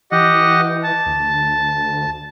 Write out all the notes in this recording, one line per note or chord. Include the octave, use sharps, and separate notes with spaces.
E3 G4 D#5 F#5
A5
D2